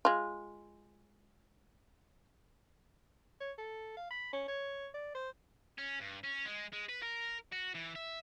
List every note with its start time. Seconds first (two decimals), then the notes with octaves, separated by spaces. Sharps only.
0.05 G#3 F4
3.40 C#5
3.58 A4
3.96 F5
4.10 B5
4.33 C#4
4.48 C#5
4.94 D5
5.15 C5
5.78 C#4
6.00 G2
6.23 C#4
6.45 G#3
6.73 G#3
6.89 B4
7.03 A#4
7.52 F#4
7.75 E3
7.96 E5